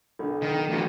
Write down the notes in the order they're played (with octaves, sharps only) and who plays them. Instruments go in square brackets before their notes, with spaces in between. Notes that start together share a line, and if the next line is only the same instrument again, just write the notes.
[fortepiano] B1 D3
[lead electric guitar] D#3
[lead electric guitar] D2 E3 [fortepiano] D4 F#4